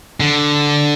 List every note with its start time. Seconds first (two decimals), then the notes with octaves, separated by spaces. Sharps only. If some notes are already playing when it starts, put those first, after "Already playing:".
0.20 D3